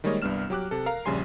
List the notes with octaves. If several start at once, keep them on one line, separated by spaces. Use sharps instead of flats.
D#3 G3 G#3 A#3 C#5 D#5
C2 G2 B3 D4 F6 E7
F#3 G4 D6 F#6
C3 A4
A#4 F5 A#5
A#1 C#3 G3 G#5 C6 C7